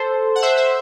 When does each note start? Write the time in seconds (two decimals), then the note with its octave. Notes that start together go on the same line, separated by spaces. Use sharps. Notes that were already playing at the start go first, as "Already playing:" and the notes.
Already playing: A4 C5
0.35 F#5
0.42 C5 E5
0.57 C5 E5